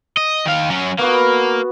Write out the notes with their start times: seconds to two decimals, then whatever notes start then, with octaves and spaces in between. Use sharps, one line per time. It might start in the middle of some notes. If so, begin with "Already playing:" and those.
0.17 D#5
0.46 D#3 F5
0.70 F#3 C#4
0.99 A#3 B3 F#4 B4